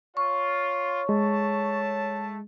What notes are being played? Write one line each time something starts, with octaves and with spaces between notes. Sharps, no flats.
F4 C#5 C#6
G#3 A3 A5